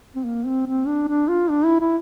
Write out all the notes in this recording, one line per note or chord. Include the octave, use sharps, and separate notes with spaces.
C4
A#3
C4
C4
D4
D4
F4
D4
E4
E4